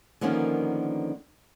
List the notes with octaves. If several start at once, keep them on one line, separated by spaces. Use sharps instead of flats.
D3 D#3 F3 A#3 B3 C#4